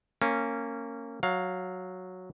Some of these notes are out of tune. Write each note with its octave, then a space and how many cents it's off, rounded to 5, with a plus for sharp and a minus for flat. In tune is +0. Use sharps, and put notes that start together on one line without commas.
A#3 -20 C#4 -10
F#3 -5 F5 +10